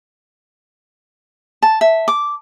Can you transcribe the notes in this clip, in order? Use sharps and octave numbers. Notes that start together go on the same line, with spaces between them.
A5
E5
D6